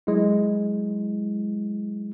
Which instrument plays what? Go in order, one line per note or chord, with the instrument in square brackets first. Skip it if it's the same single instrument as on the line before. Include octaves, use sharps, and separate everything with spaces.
[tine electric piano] F#3 G#3 E4